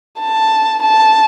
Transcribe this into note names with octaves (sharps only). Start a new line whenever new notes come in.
A5
A5